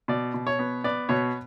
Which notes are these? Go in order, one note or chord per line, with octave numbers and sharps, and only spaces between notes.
B2 D5
B2
C#5
B3
B3 D5
B2 C#5